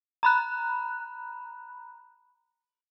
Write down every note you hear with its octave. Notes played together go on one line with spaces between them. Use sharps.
A#5 B5 F#6